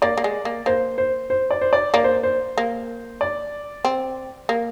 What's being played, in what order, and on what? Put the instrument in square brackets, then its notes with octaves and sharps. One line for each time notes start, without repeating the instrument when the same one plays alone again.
[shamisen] A#3 [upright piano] D5
[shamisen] A#3
G#3
A#3
[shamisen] A#3 [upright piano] C5
[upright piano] C5
C5
D5
C5
D5
[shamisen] A#3 [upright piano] D5
[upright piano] C5
C5
[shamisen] A#3
[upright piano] D5
[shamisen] C4
A#3